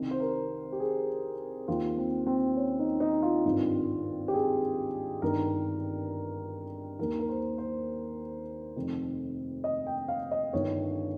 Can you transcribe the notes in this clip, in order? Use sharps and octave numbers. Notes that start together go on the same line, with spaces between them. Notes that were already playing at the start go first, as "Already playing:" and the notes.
Already playing: C2 C3 D#3
C5
A#4
G4
G#4
D#2 D#3 F4
C4
C4
C#4
D#4
D#4
F4
G#1 G2 D#3
G4
G#4
G1 G2 D#3 A#4
D#2 D#3 A#4
A#4
C5
C5
F1 F2 D#3
D#5
G5
F5
D#5
G1 G2 D#3 C#5